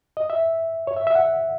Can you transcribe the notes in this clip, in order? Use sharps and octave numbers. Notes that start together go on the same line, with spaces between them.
D#5
E5
C#5
E5
E5
F#5